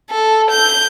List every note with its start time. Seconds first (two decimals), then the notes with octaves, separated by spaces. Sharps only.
0.10 A4
0.50 G6